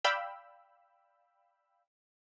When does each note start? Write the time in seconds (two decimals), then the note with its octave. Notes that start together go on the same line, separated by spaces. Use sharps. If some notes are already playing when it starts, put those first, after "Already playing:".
0.04 D5 F5 G5 B5 E6